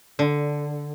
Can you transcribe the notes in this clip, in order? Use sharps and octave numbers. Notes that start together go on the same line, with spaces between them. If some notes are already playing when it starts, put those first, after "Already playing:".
D3